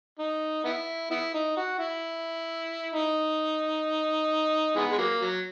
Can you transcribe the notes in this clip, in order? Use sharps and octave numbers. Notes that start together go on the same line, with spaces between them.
D#4
B3 E4
B3 E4
D#4
F#4
E4
D#4
E3 G#3 B3
G#3
F#3 A#3
F#3